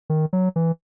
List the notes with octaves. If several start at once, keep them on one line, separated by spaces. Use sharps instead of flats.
D#3
F#3
E3